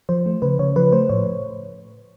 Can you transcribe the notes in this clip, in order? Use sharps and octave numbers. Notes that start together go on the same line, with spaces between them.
F3 C5
A3
C#3 B4
C#3 C#5
F3 B4
A3 C5
A2 C#5